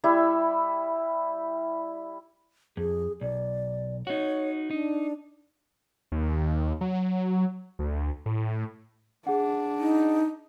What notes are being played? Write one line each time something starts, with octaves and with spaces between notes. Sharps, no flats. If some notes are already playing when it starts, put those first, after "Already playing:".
G3 E4 E5 B5
F2 G#4
B1 D5
D#4 F#4 C#5
D4 D#4
D#2
F#3
D2
A2
D4 G#4 F#5
D#4